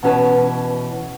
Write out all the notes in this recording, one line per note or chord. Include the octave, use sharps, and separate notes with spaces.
B2 E3 C#4 B4 A5